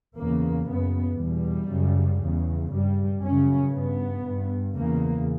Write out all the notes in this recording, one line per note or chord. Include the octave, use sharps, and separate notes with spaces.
E2 C#3 A#3
F#2 C#3 B3
E2 B2 G3
F#2 C#3
E2 C#3
G2 G3
F#2 C#3 C#4
G2 B3
G2
E2 C#3 A#3